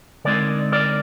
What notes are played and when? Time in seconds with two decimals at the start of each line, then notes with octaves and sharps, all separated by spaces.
0.25 D3 G#3 C4 D#4 A#4 D5
0.72 A#4 D5